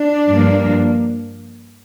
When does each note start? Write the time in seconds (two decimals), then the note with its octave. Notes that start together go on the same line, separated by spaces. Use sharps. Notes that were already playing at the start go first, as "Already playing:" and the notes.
Already playing: D4
0.28 G2 F3 A#3